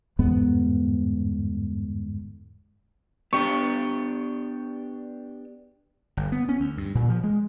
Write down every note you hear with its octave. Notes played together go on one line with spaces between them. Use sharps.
G1 E2 G#2 B3
B3 D4 G4 C#6
G1
B3
C#4
D2
G2
A#2
F3
G#3